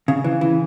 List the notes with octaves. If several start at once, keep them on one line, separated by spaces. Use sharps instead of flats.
C#3
E3
E3